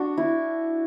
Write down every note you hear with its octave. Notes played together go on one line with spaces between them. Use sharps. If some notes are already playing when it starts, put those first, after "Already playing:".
Already playing: D4 F#4
E4